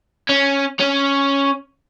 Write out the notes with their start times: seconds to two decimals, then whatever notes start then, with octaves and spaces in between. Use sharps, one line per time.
0.29 C#4
0.80 C#4